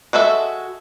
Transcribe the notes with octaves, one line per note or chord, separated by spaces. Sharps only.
G#3 F#4 A4 E5